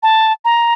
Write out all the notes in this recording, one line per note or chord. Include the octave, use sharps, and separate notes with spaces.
A5
A#5